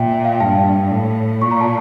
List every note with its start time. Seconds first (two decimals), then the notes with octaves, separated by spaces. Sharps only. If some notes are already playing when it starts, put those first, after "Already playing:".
Already playing: A#2 E5 G5
0.25 F5
0.32 G5
0.40 G2 F5 A5
0.91 A2
1.41 A#2 C#6
1.51 A#5
1.61 A5